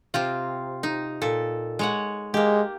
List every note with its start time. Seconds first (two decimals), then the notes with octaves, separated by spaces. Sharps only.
0.14 C3 C4 F4
0.83 D#4
1.22 A#2 A4
1.79 G#3 C#5 F#5
2.34 G#3 A#3 G4